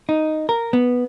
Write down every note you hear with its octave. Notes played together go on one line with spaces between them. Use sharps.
D#4
A#4
B3